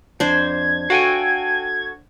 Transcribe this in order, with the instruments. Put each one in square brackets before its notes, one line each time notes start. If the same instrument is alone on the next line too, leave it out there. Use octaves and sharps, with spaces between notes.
[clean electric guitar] F2 [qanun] D4 C5 [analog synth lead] G#6
[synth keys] F#4 A4 [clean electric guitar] F5 G5 G#5